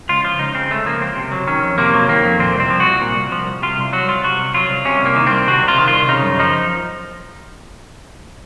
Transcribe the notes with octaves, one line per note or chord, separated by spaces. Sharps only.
C#2 F4
F3 F4
C#2 D#4
C#3 C4
C#2 A3
F3 A#3
C#2 C4
C3
F#3
D#3 C#4
F2
C3 A#3
F#3
D#3 A#3
F2
A#2 C4
C2
C4
F3
F#4
C2
A#2
C2
F3
C2
C3 F4
C2
F#3 F#4
C2 F4
C3 F#4
C2
F#3 F4
C2
C3 C#4
C2 A#3
D#3
C2 C4
C3 F#4
C2
F4
D#3
C2 F4
C#3 D#4
F#2
F3 D#4